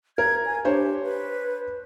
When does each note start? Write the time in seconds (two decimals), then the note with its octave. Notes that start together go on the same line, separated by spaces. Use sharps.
0.18 A#4 G#6
0.46 G#5
0.65 D4 G4 C5 C#5
1.04 B4